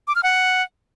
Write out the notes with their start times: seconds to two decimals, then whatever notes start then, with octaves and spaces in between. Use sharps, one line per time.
0.08 D6
0.15 F6
0.23 F#5